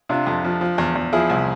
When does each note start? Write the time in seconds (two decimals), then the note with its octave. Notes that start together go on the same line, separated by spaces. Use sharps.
0.09 C3 D4 F4
0.27 F2
0.44 F3
0.61 F3
0.78 E2
0.95 E2
1.13 F3 E4 G#4
1.30 C2